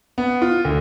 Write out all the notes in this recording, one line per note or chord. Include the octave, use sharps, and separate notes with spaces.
B3
F4
D2